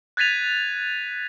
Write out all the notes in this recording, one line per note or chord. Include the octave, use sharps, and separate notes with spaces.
F#6 G#6 A6 B6 D#7 F7